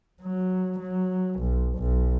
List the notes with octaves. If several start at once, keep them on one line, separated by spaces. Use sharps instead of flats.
F#3
F#3
B1
B1